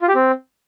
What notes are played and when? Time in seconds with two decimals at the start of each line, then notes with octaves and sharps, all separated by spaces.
0.02 F4
0.08 G4
0.15 C4